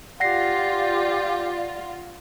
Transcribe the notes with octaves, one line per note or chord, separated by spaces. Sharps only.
F4 G4 D5 F#5 A#6 C7